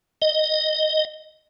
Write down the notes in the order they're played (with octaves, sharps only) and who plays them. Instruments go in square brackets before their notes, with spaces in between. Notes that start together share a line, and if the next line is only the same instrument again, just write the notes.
[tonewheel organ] D#5